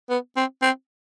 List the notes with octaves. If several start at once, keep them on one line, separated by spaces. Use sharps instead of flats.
B3
C4
C4